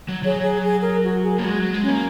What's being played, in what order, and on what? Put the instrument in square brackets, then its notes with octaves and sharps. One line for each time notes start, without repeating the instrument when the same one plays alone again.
[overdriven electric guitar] F#3
[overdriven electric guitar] F#3 [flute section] G#4 C#5
[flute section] G#4
G#4
A#4
F#4
G#4
[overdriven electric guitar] A#3
[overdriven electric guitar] G#3 [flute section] F#4
[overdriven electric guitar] F#3
G#3
[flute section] C#4
[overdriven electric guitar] A#3